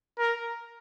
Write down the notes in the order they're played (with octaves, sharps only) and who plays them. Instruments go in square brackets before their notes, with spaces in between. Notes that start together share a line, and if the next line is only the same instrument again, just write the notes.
[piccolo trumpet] A#4